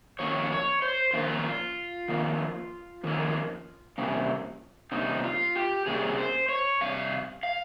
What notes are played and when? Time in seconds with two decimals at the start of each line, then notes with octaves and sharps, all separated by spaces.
0.19 F2 D#3 A#3 C#4 C#5
0.52 C#5
0.82 C5
1.13 F2 D#3 A#3 C#4 F4
2.08 F2 D#3 A#3 C#4
3.04 F2 D#3 A#3 C#4
3.98 C3 G3 A#3 C#4
4.92 C3 G3 A#3 C#4 D#4
5.23 F4
5.55 G4
5.86 C3 G3 A#3 C#4 G#4
6.18 C5
6.49 C#5
6.81 C3 G3 F5
7.43 F5